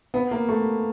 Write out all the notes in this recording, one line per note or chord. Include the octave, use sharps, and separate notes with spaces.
B3
A#3
A3